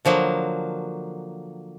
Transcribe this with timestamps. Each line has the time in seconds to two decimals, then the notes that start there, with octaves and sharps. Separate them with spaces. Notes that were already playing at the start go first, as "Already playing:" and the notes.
0.05 D3 F3 F#3 A#3